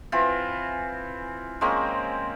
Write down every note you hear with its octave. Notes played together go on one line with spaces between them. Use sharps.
E3 C4 F4
G#3 A#3 C4 C#4